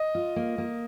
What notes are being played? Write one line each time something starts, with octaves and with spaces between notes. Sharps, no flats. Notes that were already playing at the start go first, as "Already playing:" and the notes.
Already playing: D#5
F4
A#3
A#3